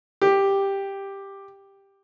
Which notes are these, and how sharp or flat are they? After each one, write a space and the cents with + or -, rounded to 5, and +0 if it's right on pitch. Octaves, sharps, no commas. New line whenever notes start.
G4 +5